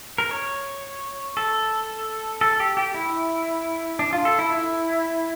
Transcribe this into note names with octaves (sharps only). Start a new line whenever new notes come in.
A#4
C#5
A4
A4
G4
G4
E4
D4
F4
A4
E4
E4